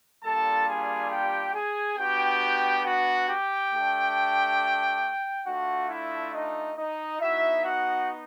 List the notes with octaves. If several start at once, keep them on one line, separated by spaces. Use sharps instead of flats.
G3 A#3 D4 F4 A4 A5
G#4 G#5
G4 G5
G#4 G#5
B3 D4 F#4 G4 G5
F#4 F#5
G4 G5
A3 D4 G4
A3 D4 F4 F#4 F#5
E4 E5
D#4 D#5
D#4 D#5
B3 D#4 E4 F#4 E5
F#4 F#5